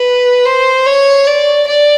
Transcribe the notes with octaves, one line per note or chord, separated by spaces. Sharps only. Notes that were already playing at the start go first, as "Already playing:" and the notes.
Already playing: B4
C5
C#5
D5
D5